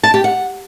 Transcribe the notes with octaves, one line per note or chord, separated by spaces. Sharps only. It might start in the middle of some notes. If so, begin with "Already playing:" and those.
A5
G4
F#5